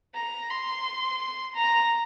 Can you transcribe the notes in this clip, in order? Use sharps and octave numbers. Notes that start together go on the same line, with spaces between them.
A#5
C6
A#5